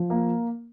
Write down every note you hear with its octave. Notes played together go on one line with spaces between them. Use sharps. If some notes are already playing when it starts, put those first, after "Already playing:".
Already playing: F3
A#3